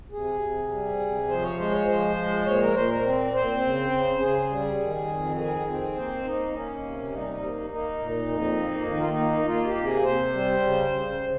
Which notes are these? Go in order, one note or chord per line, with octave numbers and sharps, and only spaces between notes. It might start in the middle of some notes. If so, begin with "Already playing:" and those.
C3 G#4
C3
G3
C3
F3 C5
C#5
G#3 C5
C#5
F3 C5
G#3
A#2 C#5
A#4
A#2 C5
A#4
C4
C4 C5
C#3
C#3
C#3 G#4
G3
D#3
F2
D#3 G#4
C4
A#3 C5
A#3 D#4
A#3 C#4
C3
G3 D#4
A#3
A#3 D#4
A#2
F2
A#3
D#3 D#4
F4
D#4
A#3
A#3 F4
G4
C3
G#4
C3 C5
G3
C#3
C#3
C#3